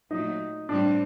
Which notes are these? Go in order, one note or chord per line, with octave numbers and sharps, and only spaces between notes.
A#2 F#3 A3 D#4
A2 G3 C4 D4